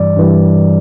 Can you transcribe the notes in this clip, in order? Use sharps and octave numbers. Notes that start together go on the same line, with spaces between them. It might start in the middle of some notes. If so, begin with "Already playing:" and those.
Already playing: G2 E3 G3 D5
G2 E3 G3